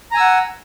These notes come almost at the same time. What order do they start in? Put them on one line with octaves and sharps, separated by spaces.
A#5 G#5 E6 F#5